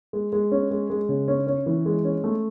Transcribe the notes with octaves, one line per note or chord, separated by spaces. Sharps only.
G#3
G#3
C#4
G#3
G#3
C#3
C#4
C#4
E3
G#3
C#4
A3